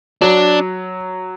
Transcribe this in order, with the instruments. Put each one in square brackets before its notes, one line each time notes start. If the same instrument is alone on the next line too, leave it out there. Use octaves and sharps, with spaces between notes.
[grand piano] F#3 [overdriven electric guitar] D4